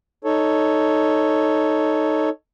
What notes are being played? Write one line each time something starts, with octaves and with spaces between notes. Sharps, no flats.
D#4 A4 C#5